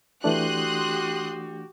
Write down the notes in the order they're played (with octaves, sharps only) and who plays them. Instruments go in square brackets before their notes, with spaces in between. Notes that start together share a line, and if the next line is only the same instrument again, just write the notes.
[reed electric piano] E3 A3 D4 [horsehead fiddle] F#4 G4 [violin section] C6 D#6 F#6